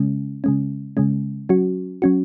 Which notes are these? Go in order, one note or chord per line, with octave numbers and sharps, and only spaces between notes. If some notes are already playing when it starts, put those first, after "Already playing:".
Already playing: C#3 G#3 C#4
C#3 G#3 C#4
C#3 G#3 C#4
F#3 C#4 F#4
F#3 C#4 F#4